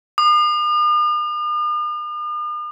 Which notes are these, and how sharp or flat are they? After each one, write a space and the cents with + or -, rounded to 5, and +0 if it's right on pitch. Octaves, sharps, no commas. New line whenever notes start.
D#6 -45